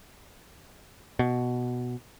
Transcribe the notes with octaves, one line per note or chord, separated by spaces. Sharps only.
B2